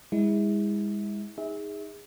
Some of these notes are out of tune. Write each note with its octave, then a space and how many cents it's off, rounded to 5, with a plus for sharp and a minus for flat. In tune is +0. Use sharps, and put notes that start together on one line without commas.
G#3 -25 E4 -30
D#4 +20 G#4 -20 E5 -25